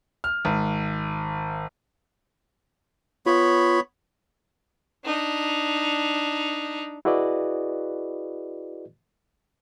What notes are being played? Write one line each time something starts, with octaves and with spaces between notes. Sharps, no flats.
F6
G#1
B3 F4 C#5 B5
D4 D#4
E4 F#4 G#4 B4 D5 D#5